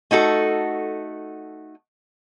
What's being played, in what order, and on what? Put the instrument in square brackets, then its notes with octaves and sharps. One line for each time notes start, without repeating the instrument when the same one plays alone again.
[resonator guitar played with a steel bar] A3 D#4 F#4 A4